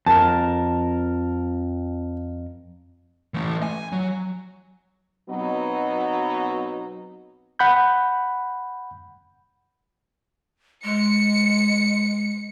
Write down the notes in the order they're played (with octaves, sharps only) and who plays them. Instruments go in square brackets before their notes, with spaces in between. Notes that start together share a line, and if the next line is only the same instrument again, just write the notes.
[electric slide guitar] F2 A#4 [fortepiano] A5
[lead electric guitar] E3 A3
G#5
F#3
[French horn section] B2 F#3 B3 C4 D#4 F#4
[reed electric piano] F#5 B5 G6
[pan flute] G#3 [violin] C#7